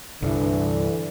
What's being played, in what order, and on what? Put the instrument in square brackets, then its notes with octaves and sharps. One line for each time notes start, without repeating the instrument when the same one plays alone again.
[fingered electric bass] C2 G2 [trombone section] D3 E3